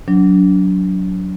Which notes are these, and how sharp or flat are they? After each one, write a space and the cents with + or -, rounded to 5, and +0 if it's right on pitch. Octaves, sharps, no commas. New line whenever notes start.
F#3 +0 D4 -35